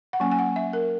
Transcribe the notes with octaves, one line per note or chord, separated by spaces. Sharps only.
F#5
F#3 A#3 C#4 G#5
G#5
F#5
E5
A#4